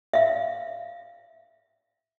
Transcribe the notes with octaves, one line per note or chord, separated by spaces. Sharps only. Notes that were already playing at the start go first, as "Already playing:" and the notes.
E5 F5